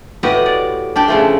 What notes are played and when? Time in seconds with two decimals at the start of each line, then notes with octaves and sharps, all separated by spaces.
0.23 A2 B3 F#4 G4 D#5 F#5
0.46 D5
0.96 D4 G4 G5
1.08 C#3 F3 A3